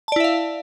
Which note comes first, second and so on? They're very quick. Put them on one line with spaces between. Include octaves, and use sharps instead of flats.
A5 D5 E4 E5 F5